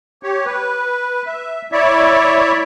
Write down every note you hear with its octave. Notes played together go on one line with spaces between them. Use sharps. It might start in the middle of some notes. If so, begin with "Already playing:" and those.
G4 C#5
B4
E5
E4 C#5 D5 E5